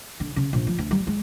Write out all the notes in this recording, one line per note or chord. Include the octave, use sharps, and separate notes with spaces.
D3
C#3
A#1
F3
D2
G3
G#3